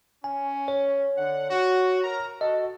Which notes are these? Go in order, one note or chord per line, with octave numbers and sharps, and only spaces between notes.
C#4 G#5
C#5
D3 F#5
F#4
A#4 A#5
F#4 A4 D#5